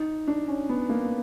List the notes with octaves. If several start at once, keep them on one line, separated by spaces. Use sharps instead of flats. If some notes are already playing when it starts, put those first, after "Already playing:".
Already playing: D#4
D4
C#4
B3
A#3